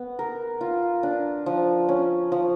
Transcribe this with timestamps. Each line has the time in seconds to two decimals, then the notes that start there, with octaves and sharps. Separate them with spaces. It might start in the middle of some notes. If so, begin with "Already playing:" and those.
Already playing: B3
0.19 A#4
0.61 F4
1.03 D4
1.46 F3
1.89 C#4
2.32 F3